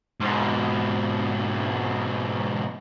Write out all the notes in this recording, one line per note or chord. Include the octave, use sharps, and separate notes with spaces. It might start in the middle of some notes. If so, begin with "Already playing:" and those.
G#2 B2